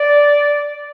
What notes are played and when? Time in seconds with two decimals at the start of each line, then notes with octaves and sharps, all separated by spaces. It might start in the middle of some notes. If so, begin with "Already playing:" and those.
Already playing: D5